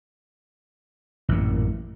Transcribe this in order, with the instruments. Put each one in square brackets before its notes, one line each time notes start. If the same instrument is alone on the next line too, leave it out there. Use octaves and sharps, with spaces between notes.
[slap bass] A1 F#2 A#2